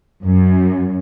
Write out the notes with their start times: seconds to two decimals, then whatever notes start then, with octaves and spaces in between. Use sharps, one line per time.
0.24 F#2